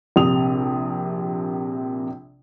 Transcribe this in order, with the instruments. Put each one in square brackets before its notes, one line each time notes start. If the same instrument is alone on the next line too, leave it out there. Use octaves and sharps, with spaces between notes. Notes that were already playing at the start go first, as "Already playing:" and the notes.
[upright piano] A#1 C3 D#6 F7